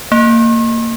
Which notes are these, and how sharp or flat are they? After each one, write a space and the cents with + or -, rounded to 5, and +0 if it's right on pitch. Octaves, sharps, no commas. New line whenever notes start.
A#3 -20